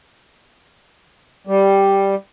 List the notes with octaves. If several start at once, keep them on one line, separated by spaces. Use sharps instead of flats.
G3